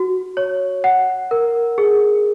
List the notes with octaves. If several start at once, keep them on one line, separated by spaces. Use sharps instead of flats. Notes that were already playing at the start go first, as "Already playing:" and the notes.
Already playing: F#4
C#5
F#5
A#4
G#4